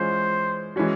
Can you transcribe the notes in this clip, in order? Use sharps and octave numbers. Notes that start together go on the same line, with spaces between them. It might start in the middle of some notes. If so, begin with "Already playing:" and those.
Already playing: E3 G#3 C#4 F4 C5
E3 G#3 C#4 F#4